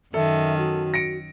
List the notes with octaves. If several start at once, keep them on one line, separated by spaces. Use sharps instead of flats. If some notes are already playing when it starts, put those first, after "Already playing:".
F#2 D#3 A4 E5
F#4
A#6 C#7 D7